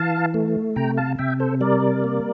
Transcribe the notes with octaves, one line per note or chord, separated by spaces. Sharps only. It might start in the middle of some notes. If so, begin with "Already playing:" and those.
Already playing: E3 F5 A5
A3
C3 G5 A#5
F5 A5
C3 E5 G5
A4 C5
G3 A#4 D5
A#3